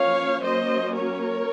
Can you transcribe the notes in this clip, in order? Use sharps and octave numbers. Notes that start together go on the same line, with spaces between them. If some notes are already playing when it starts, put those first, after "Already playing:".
Already playing: F3 A#3 C#4 C#5 F5
F#3 A#3 C#4 C5 D#5
A#4 C#5